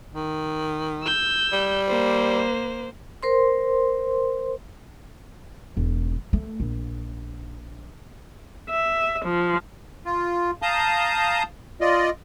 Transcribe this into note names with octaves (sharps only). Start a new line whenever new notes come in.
D#3
E6 G6
G3
A#3 C5
A#4 C5 C6
E1 G#2
A3
A#1
E5
F3
F4
F5 A5 A#5 D#6 G6
F4 D5 D#5